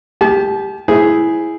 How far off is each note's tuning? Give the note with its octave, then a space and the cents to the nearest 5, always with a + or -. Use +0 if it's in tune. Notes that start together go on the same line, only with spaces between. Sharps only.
G4 +10 A5 -40
E4 +0 G#4 +0 C5 +0